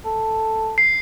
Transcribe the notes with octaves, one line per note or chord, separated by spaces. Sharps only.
A4
C7